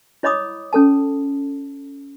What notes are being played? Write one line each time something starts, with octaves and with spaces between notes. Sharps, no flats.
E4 C#5 D#5 B5 D6 D#6
C#4 A4 A5